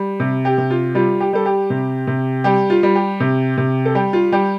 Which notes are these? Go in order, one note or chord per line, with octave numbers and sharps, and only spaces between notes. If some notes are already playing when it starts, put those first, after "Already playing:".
Already playing: G3
C3
G4
C3
F4
G3 F4
G4
G3 A4
G4
C3
C3
G3 G4
F4
G3
G4
C3
C3
A4
G3 G4
F4
G3 G4